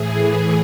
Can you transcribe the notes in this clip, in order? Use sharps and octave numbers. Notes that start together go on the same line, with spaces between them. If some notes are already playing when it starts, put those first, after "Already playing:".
Already playing: A2 E3 G#4
G#4